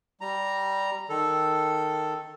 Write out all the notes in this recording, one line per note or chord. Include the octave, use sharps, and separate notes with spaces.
G3 A#5
D#3 A4